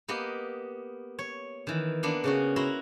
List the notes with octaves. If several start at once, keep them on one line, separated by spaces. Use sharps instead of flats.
A#3 B3 G4 D#5
C#5
D#3 E3
A#3 B3 D4
C#3 C#4 F#4
E4 F#4 A#5 C6